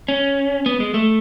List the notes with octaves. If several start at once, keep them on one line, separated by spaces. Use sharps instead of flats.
C#4
B3
G#3
A3